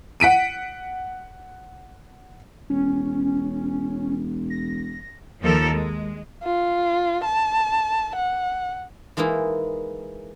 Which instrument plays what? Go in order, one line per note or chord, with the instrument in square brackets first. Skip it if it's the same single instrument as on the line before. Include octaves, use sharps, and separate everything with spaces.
[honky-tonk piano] F#5 B6 D7 D#7
[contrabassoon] E1 [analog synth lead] C#4
[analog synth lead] A#6
[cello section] D#2 F3 A4 A#4
G#3
[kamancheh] F4
A5
F#5
[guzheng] E3 G#3 A#3 D#4 E4